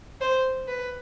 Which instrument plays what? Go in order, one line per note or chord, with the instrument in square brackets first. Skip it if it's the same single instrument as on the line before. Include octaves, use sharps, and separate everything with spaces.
[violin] C5
B4